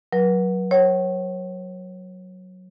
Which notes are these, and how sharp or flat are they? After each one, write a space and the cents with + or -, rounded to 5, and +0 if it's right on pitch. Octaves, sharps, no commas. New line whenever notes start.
F#3 +0 B4 -40
C#5 -30 F#5 +45